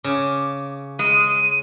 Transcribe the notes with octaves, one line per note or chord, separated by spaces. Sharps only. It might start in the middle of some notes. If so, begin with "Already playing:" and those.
C#3 D6
G#3 D#7